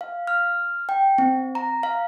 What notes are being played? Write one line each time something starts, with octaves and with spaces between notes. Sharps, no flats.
F5
F6
G5
C4
A#5
F5